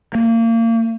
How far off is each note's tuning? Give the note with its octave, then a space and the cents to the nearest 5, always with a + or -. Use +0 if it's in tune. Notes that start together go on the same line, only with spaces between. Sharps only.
A#3 -30